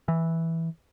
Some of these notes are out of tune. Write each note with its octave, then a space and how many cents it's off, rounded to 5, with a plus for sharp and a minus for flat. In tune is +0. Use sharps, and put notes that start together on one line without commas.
E3 -5